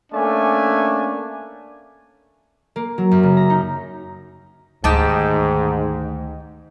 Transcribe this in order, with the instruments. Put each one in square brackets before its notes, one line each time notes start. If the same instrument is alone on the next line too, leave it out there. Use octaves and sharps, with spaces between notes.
[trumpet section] A3 A#3 C#4 D4 D5 G#5
[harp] A#3
F#3
F#2
C#3
A#5
D#4
[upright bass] D2 D#3 [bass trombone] G#2 [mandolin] D#4 G4 A5